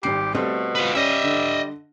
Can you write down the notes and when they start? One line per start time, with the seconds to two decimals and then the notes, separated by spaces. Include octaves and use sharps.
0.03 G#1 G3 G4 C7
0.34 B2 G3 A3 C4
0.75 F4 B4
0.95 G3 C#4 D#5 E5
1.23 D3